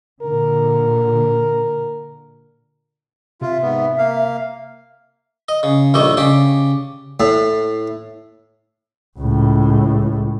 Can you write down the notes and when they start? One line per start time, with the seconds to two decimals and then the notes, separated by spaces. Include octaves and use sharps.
0.22 A#2 D3 A#4
3.41 C3 F4 E5
3.62 G#2 B3
3.98 A#3 F5
5.49 D#5
5.63 C#3
5.94 A#1 D#2 G3 A3 D#5
6.17 C#3 G4 D5
7.20 A2
9.19 C#2 A2